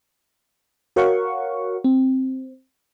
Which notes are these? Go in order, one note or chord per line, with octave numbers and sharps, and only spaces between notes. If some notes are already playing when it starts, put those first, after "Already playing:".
F#4 A#4 C#5 F5 F#5 C#6
C4